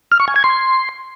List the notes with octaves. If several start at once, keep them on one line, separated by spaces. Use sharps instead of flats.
F6
C#6
G#5
G#6
C6